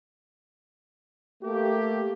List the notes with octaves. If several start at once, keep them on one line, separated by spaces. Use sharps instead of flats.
A3 A#3 G4